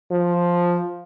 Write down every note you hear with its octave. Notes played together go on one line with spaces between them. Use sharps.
F3